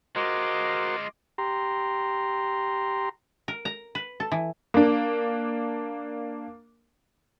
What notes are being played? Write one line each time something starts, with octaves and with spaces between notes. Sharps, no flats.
G#3 F4 F#4 A#4 C5 D#5 C6 D6
G4 A#5 C6
A#4
A#5
B4
A4
E3
A#3 D4